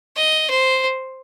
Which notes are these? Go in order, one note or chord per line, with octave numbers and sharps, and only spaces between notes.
D#5
C5